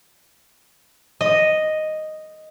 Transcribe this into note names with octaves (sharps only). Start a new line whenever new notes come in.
D#5